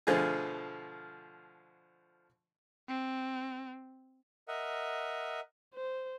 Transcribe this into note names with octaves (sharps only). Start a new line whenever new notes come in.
B2 D3 F3 A3 F4 G#4
C4
A#4 D#5 E5 F#5
C5